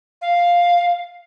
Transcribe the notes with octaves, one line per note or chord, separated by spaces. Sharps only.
F5